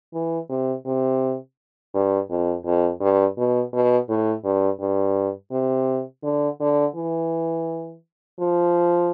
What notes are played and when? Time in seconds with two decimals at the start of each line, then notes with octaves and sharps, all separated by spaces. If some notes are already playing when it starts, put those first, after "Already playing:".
0.14 E3
0.50 C3
0.86 C3
1.94 G2
2.30 F2
2.65 F2
3.01 G2
3.38 B2
3.73 B2
4.09 A2
4.44 G2
4.80 G2
5.52 C3
6.24 D3
6.61 D3
6.96 E3
8.40 F3